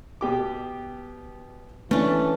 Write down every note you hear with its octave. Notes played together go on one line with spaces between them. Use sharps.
B2 G4 D6
E3 A3 C#4 D4 B4